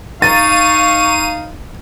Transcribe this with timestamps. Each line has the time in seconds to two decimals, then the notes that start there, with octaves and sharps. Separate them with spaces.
0.22 D#4 F5 C#6 A6 D#7